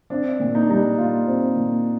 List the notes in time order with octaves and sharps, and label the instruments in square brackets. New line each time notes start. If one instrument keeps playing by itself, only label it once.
[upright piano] C4 [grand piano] D4
[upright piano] A#2
[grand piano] D#4
D4
[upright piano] G3 [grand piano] D#4
[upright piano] A#2 [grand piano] F4
[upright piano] C4
A#2